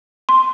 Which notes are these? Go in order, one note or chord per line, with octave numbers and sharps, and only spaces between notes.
C6